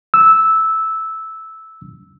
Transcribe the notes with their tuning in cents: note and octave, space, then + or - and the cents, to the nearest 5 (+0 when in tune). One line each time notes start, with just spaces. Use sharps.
E6 -10